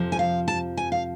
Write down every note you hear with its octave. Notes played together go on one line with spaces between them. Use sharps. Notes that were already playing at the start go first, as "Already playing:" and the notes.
Already playing: F2 C3 F3
G#5
F5
A5
G#5
F5